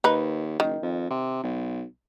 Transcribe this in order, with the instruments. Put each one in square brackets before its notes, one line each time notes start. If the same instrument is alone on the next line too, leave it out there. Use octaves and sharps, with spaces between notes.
[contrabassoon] D#2 [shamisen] D#4 B4
[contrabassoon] F#1 [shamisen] D#3
[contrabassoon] F2
C3
B1